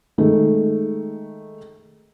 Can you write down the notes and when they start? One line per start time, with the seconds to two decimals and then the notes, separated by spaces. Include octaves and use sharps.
0.18 D#3 G#3 A3